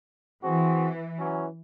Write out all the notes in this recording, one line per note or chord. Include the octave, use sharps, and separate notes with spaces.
E3 C4 F#4 G#4
E3 F#3 C#4